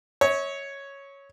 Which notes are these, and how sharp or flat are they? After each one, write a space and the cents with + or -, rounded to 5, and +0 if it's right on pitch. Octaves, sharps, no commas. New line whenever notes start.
C#5 +0 E5 -45